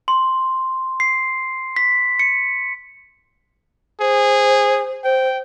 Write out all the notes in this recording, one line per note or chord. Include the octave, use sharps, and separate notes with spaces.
C6
C7
B6
C#7
G#4 C5
C5 G5